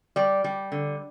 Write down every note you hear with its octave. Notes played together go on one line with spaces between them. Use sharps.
G3 D5
G3
D3